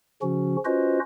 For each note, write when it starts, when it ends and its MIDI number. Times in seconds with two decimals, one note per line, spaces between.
0.22 0.57 49
0.22 0.57 53
0.22 0.57 61
0.22 0.57 66
0.65 1.00 61
0.65 1.00 65
0.65 1.00 66
0.65 1.00 71
0.65 1.00 72
0.65 1.00 75